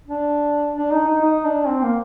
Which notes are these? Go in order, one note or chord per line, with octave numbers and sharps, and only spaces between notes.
D4
D4
D#4
D#4
D#4
D4
C4
A#3